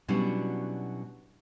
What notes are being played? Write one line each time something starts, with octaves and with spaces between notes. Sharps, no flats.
B2 F#3 G3 C#4 D4 E4